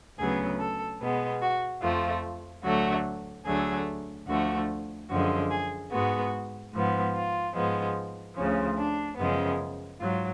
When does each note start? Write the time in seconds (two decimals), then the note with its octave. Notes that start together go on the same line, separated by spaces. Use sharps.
0.18 D2 C#3 F#3 B3 G#4
0.59 A4
1.00 B2 G#3 B3
1.42 F#4
1.82 F2 F3 A3 F4
2.64 D2 D3 F#3 A3 F#4
3.46 D2 D3 F#3 A3 G#4
4.27 D2 D3 F3 A3 F#4
5.09 F#2 D3 F3 G#3 F#4
5.50 G#4
5.91 G#2 G#3 B3 F#4
6.73 G#2 F3 B3
7.15 F4
7.55 G#2 F3 G#3 B3
8.36 D2 C#3 F3 C#4
8.78 D4
9.18 F#2 C#3 F3 G#3 B3
10.00 G#2 F#3 F4